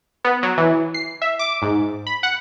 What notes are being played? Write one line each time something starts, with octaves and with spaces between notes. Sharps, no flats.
B3
F#3
E3
C7
E5
D6
G#2
B5
F#5